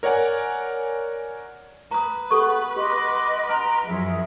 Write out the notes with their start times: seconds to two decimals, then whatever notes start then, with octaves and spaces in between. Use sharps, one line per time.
0.03 A#4 C#5 D5 F#5 G#5
1.91 B4 A#5 D#6
2.31 B3 G4 A4 C#6
2.76 G4 D#5 C6 D6
3.49 A#4 A#5 C6
3.87 F#2 F3 G#4 E5